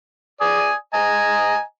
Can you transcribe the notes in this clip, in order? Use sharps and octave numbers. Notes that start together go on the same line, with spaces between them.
D5 G#5 D#6
D#5 G#5 A#5